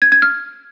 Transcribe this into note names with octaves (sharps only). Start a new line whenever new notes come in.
G#6
G#6
F6